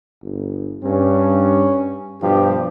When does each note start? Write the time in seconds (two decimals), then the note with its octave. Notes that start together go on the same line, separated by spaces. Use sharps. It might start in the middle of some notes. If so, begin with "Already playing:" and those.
0.23 G1
0.83 G2 C#4
2.22 G2 B2 F3 G4